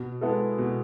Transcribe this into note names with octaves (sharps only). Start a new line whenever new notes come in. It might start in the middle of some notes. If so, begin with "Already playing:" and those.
Already playing: B2
G#3 B3 E4 A4
B2